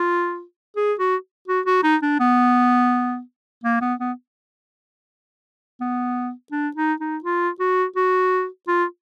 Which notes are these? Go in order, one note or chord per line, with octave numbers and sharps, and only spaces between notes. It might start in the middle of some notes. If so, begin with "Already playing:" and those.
Already playing: F4
G#4
F#4
F#4
F#4
D#4
D4
B3
A#3
B3
B3
B3
D4
D#4
D#4
F4
F#4
F#4
F4